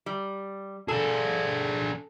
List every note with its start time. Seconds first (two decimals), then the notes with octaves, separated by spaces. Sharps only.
0.06 G3
0.88 D4 G#4 A4